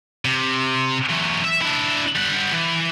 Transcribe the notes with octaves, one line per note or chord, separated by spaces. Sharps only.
C3
E3 F#3
E5
D4 E4
G3 F#5
E3